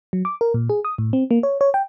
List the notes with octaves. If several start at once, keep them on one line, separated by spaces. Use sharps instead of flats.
F#3
D6
A#4
A#2
G#4
D#6
A2
C4
A#3
C#5
C#5
G5